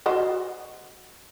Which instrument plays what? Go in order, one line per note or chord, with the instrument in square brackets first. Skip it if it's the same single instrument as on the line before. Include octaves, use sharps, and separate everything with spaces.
[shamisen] F#4 C5 D#5